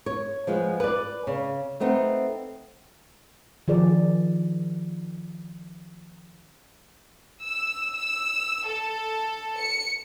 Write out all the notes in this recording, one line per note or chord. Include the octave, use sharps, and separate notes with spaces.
C#5
F3 G#3 B3
B4 D5
C#3
A3 B3 C4 D#4
D#3 F3 G#4 D5
E6
E6
A4
C#7